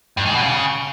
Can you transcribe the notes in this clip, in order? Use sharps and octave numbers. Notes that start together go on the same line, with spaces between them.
G2
G#2
B2
C#3